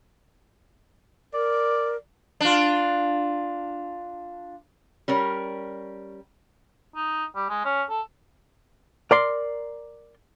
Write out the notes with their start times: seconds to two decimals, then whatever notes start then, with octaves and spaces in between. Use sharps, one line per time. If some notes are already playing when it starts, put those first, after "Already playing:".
1.34 A#4 D5
2.41 D4 F4
5.08 G3 C#4 A#4
6.96 D#4
7.36 G3
7.49 G#3
7.65 C#4
7.90 A4
9.11 A#4 D5 C6